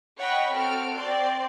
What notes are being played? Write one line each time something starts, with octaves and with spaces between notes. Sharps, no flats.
C#5 D#5 F#5 G5 B5 C#6
C4 F#4 A4 F6 D7
C4 D5 C6